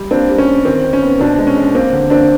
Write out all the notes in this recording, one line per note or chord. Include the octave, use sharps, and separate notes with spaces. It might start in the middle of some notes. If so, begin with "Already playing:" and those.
Already playing: G3
A#3 C4 D4
G3
C#4
G3
D#3 C4
D#3
C#4
B3
B2 C4 D4
G#3
C#4
G#3
A#3 C4
D3
A#3 C4 D4